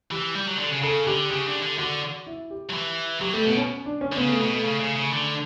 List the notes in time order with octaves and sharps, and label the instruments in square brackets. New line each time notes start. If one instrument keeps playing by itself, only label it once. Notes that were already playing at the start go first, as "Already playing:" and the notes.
[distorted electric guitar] E3 [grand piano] G4
[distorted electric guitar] G3
F#3
D3
C#3
[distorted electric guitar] C#3 [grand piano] A4
[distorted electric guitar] D3 [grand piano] G4
[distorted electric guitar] C#3 [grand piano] G4
[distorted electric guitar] D3
D3
[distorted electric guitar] D3 [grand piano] F#4
[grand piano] E4
G4
[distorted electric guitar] F#3
E3
[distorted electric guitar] F#3 [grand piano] G4
[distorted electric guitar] G3 [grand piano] A3
[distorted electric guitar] B2 [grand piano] B3
[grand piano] C#4
D4
C#4
[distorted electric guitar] D3
[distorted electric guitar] C#3 [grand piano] B3
[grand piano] A3
[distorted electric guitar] B2 [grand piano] B3
[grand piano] A3
[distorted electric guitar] C#3
C#3
C#3
D3